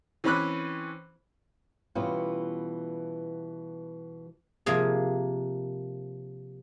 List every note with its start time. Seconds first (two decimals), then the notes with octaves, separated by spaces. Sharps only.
0.24 E3 C4 C#4 B5 D6 F#6
1.95 B2 E3 G3 B3 C#4 F4
4.66 C3 F3 A#3 G#4